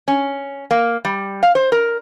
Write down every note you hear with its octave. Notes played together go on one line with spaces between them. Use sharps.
C#4
A#3
G3
F5
C5
A#4